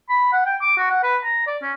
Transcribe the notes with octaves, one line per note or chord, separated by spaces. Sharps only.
B5
F#5
G5
D6
F#4
F#5
B4
A#5
D5
C#4